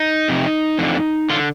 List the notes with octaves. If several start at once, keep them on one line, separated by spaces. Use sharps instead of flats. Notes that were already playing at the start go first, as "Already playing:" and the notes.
Already playing: D#4
F2 C3
F2 D3
D3 F4